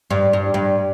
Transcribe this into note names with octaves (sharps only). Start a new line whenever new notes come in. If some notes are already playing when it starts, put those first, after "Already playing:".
G2
G2
G2